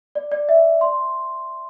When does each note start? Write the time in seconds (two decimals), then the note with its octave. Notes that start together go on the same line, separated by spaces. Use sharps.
0.15 D5
0.32 D5
0.49 E5
0.81 C6